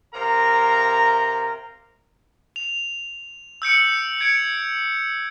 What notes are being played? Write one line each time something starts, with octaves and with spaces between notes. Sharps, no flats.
C3 A#4 F5 A#5
F7
E6 G6 C#7 D7
G#6 C#7 D7